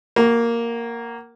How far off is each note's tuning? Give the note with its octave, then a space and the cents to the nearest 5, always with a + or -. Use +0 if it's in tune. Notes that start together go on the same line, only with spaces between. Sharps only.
A#3 +0 F#4 +25